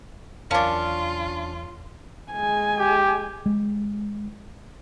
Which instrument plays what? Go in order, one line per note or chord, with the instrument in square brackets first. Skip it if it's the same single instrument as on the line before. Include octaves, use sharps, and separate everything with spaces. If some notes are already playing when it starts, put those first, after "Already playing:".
[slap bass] E2 F#3 [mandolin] C#4 D4 [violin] F4 [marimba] A#4 F5 A5
[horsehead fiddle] G#3 G#5
[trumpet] G4
[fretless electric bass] G#3